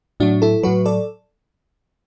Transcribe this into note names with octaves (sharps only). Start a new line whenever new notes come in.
A2 F#3 D4 F#4
E4 A4
A2 F#3 F#4 B4
A4 D5